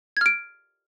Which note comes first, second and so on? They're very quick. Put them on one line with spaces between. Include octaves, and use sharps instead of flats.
G#6 F6 D7